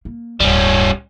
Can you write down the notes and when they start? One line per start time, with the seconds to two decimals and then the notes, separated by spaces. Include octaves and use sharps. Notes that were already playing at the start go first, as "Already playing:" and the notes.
0.05 A#3
0.40 D1 G2 G3 C#4